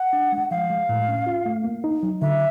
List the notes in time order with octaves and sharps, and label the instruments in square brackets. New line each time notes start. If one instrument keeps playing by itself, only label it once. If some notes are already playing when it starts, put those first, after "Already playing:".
Already playing: [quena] F#5
[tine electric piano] D4
G#3
[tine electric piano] F3 [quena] F5
[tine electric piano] G#3
A2
C#4
F4
A3
A#3
D#4
F#3
[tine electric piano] D3 [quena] E5